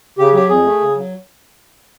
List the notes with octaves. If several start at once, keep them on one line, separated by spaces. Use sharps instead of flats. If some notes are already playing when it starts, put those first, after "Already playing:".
C#3 G4
F#3 G4
F2 G#4
A3
C#3
F#3